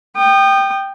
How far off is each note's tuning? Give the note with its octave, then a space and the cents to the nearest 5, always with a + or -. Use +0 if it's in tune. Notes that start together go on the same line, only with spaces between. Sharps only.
G5 +0 D#6 -30